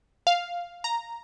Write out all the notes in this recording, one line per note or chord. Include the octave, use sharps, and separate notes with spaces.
F5
A#5